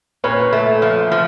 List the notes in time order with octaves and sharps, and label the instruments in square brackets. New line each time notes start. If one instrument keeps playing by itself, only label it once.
[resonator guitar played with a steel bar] A#2 [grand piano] B4 C#5
[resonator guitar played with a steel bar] A3
F3
F3